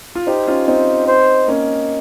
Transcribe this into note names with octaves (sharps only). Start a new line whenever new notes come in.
F4
D#4 G4 C5
C#4 F4
C4 D#4 C5
C5
A#3 C#4